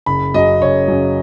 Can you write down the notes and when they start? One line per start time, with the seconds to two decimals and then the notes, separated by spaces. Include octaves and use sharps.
0.06 F#1 B5
0.34 F#2 C#3 F#3 D#5
0.61 F#1 C#5
0.88 F#2 C#3 F#3